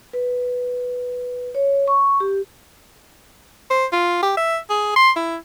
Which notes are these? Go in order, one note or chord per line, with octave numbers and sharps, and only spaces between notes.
B4
C#5
C#6
G4
C5
F4
G4
E5
G#4
C6
E4